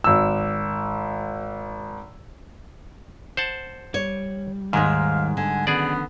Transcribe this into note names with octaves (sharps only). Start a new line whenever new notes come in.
G#1 E6
C5 F#5 A5
G3 C#5
D#2 G#2 D#3 G#3 F5
D3 G#5
D#3 F#3 B3 C#4 G#4 D5